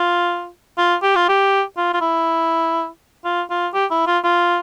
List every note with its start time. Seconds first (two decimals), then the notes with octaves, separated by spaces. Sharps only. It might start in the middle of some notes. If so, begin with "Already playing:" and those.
Already playing: F4
0.78 F4
1.03 G4
1.16 F4
1.29 G4
1.77 F4
1.94 F4
2.01 E4
3.24 F4
3.50 F4
3.74 G4
3.91 E4
4.07 F4
4.24 F4